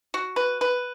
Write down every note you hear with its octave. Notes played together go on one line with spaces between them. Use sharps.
F#4
B4
B4